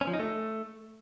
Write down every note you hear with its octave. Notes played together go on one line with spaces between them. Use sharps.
C#4
F3
D#4
A3